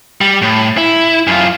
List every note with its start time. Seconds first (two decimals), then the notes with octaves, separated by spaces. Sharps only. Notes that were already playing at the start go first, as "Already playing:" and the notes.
0.21 G3
0.42 A2
0.78 E4
1.27 F#2 F4